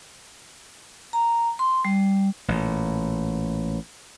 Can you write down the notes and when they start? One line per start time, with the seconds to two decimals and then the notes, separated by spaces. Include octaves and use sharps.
1.13 A#5
1.59 C6
1.85 G3
2.48 A1 A#2